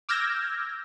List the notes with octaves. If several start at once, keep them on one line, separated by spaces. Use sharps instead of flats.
D6 E6 F6 G6 G#6 A#6